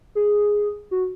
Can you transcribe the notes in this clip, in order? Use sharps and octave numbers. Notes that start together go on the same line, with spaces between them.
G#4
F#4